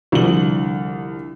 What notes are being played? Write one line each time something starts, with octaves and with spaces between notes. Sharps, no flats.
C2 D3 F3 F#7